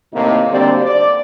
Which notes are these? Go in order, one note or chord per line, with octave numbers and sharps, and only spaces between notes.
A2 C3 D#3 A#3 D#4
D2 D3 G3 A#3 C4 D5
D5